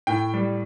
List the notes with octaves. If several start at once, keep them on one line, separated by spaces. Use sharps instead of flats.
A2 G5
G3